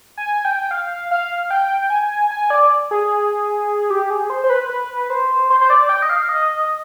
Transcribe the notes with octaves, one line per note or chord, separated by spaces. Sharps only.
G#5
G5
F5
F5
G5
G#5
G#5
D5
G#4
G4
G#4
C5
C5
B4
B4
C5
C5
C5
D5
G5
D#5
F5
D#5